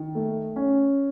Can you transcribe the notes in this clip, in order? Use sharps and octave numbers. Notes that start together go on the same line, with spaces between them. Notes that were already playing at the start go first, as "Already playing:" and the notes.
Already playing: D#3
A3
C#4